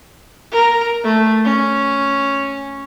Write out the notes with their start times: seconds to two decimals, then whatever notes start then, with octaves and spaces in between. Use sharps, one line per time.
0.52 A#4
1.04 A3
1.45 C#4